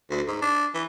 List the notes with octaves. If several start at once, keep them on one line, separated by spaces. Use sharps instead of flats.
D2
G#2
D4
E3